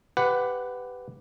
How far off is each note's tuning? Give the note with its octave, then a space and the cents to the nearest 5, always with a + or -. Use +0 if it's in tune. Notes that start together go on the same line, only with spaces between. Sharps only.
G4 +0 B4 +15 F#5 +0